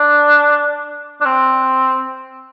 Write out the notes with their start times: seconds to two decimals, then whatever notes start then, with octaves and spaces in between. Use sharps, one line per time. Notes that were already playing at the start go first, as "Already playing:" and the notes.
Already playing: D4
1.21 D4
1.26 C4